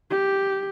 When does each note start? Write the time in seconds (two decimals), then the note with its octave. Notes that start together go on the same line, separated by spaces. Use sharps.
0.10 G4